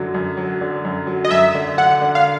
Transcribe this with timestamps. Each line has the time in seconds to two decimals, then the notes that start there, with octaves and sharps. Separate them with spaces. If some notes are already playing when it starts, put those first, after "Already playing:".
Already playing: F#2 D3 F#3
0.14 F#2
0.37 F#3
0.61 D3
0.84 F#2
1.07 F#3
1.24 D#5
1.31 F#2 E5
1.54 D3
1.78 D3 F#5
2.01 D3
2.15 F5